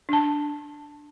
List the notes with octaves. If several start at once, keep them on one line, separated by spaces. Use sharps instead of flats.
D4 A5